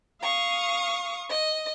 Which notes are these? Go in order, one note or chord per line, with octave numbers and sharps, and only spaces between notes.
F5 C#6 D#6
D#5